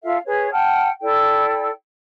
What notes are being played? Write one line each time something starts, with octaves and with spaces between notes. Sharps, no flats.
F4 A4 E5 F5
G#4 B4 C#5
F#5 G5 A5 F6
E4 A4 D5 G5